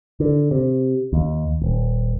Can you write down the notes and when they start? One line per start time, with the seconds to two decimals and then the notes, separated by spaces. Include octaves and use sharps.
0.20 D3
0.51 C3
1.13 D#2
1.62 D#1